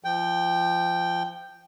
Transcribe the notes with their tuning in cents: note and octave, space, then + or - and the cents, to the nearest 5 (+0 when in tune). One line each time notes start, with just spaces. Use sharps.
F3 -20 G5 +0